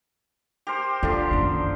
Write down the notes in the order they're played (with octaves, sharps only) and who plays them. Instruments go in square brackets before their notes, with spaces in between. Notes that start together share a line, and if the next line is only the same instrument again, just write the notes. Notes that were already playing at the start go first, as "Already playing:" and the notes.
[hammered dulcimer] G4 A#4 C5
[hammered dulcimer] D3 F3 D4 [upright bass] F4
[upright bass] F#1 D#3